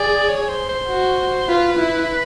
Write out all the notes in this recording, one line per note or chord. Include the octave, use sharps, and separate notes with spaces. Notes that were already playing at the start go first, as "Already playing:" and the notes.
Already playing: G#4 D5
C#5
C#5
C5
C5
F#4
F4 B4
E4